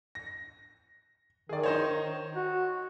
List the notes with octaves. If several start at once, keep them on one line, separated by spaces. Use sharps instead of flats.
A#6
D#3 G#4 D5
D#4 C5 C#5
F#4